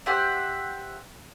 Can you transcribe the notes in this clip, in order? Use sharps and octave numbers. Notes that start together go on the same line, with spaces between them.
G4 C5 E5 F#5